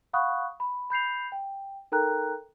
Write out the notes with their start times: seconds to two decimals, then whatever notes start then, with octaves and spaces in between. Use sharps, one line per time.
0.13 F5 F#5 B5 C#6 D#6 F#6
0.60 B5
0.90 B5 G6 C7 F7
1.32 G5
1.92 D#4 A4 A#4 G5 A#5 F#6